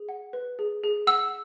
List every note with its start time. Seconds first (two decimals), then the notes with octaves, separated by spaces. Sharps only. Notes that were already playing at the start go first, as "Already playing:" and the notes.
Already playing: G#4
0.09 F#5
0.33 B4
0.59 G#4
0.84 G#4
1.07 F#5 E6